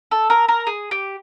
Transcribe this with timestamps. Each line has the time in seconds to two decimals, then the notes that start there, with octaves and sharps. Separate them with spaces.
0.11 A4
0.30 A#4
0.48 A#4
0.67 G#4
0.91 G4